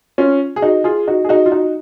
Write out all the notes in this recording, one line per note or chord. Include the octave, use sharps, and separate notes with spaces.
C#4 F4
G#4
D#4 F#4
F4 G#4
D#4 F#4
G#4
D#4 F#4
F4
D#4 F#4